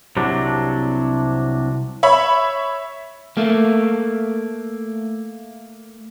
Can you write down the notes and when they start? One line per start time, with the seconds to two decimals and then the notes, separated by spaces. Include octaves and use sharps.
0.17 C2 C3 F#3 D4
2.03 C#5 E5 B5
3.37 A3 A#3